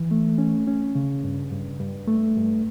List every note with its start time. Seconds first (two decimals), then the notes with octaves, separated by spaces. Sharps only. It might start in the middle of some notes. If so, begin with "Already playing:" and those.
Already playing: E3
0.11 A3
0.38 C#4
0.68 C#4
0.95 C#3
1.24 G2
1.52 G2
1.80 G2
2.08 A3
2.36 G2